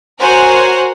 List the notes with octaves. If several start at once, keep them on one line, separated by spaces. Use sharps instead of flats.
F#4 A#4 C5 C#5 F#5 G#5